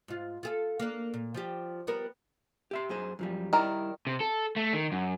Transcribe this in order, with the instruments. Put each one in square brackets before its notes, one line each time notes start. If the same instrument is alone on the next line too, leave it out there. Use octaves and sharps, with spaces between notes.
[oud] G#2 F4
F4 G#4 A4
A#3 D4
A#2
F3 G3 G4
G3 B3 A#4
[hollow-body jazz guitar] G4 E5 C6
F#2 G#4 C5
F#2 F3 G3
[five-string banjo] D#3 A#4 [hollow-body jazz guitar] G3 E4 D5
[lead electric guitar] C3
A4
A3
D#3
F#2